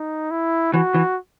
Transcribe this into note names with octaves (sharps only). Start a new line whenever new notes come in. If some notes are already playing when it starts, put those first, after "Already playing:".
Already playing: D#4
E4
E3 F#4
E3